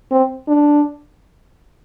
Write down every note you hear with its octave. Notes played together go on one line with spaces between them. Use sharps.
C4
D4